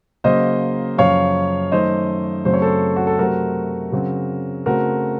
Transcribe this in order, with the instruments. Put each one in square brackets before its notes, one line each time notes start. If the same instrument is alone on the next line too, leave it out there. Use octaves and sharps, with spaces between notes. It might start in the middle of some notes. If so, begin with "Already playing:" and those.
[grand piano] C#3 F#3 A#3 C5 D#5
F#2 C#3 F3 C#5 F5
F#2 D#3 A3 C5 D#5
F#2 C#3 F#3 A3 C4 C5
C#5
A4 C5
F#4
A4
C3 F#3 A3 C4 F#4 A#4
C#3 F#3 C4
C#3 A3 C4 F#4 A#4